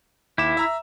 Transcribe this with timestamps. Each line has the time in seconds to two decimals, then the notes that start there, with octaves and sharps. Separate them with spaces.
0.38 D#2 E4 D6 E7
0.57 E5 A#5 E6